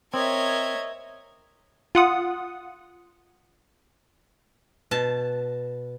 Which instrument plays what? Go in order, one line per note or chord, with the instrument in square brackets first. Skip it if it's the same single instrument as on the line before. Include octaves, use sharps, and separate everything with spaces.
[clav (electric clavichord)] C4 [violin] A#4 G#6 [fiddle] C#5 E5 [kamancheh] D#5
[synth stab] F4 F#5 D#6
[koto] B2 A5